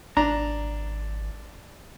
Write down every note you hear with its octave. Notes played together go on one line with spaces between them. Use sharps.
G#1 D4 A#5